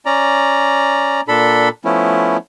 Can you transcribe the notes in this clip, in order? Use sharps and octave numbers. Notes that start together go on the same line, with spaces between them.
C#4 D5 A#5
A#2 D4 A4 B5
F3 A3 B3 C#4 E4